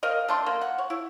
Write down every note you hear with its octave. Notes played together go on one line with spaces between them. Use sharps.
A#4 D#5 F5
A3 D4 C6
A#3
F#5
C#5
E4